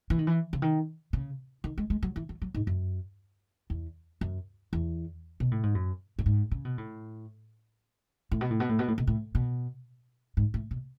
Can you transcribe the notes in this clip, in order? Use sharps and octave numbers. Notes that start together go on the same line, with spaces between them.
E3
D#3
E3
C#3
D#3
C#3
D#3
G#3
G#3
F#3
E3
F#3
F#3
G#2
F#2
E2
F#2
E2
B2
A2
G#2
F#2
A2
G#2
C#3
B2
A2
A2
B2
A2
B2
A2
B2
A2
B2
A2
B2
G#2
A2
B2